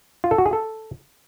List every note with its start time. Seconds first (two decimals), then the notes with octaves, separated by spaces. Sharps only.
0.24 F4
0.31 A4
0.38 F#4
0.46 G#4
0.53 A4